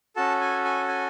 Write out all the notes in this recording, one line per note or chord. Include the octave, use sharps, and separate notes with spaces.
C#4 F#4 A4 A5
G#5
G#5
G#5